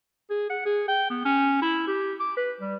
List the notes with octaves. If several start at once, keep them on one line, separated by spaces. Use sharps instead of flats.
G#4
F#5
G#4
G5
B3
C#4
E4
G4
D6
B4
G3